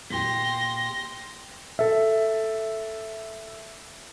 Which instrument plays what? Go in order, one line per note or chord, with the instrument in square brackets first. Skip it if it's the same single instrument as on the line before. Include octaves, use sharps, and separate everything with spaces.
[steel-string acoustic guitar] A#2 G4 [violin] C6 A#6
[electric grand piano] A4 E5